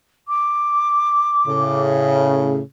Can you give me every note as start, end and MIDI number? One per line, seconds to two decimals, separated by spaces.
0.28 1.80 86
1.47 2.61 45
1.47 2.61 49